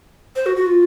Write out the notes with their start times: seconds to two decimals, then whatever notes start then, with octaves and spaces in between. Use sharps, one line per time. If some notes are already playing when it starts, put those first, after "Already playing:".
0.36 C5
0.46 F#4
0.56 F#4
0.66 F4